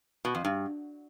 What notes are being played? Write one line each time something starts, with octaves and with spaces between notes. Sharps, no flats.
B2
F2
G2